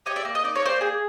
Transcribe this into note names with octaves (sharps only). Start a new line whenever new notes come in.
G4 C#5 D#5
D5 E5
A#3
D#5
D#4 D5
C#5
A#3 C5 D5
G#4